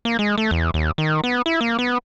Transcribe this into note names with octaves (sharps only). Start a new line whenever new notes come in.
A#3
G#3
A3
E2
D#2
D#3
B3
E4
A#3
B3